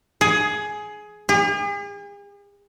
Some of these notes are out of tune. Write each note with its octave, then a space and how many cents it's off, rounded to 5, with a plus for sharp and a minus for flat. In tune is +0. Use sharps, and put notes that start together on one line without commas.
G#4 +15
G#4 -45